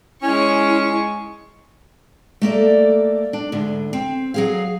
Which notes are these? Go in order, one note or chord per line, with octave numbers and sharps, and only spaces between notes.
G#3 C#4 E4 C#6
A3 A#3 A4 D5
D4
D2 G#2 D3
C4
F#3 G#4 F5